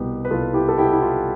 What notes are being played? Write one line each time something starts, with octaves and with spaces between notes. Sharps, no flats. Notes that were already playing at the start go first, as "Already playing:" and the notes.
Already playing: C2 B2 B3 G4
B4
C2 F4 A4
E4 G4
A4
B2 B3 E4 G4
E4
F4